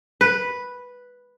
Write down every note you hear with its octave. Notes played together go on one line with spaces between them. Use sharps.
B4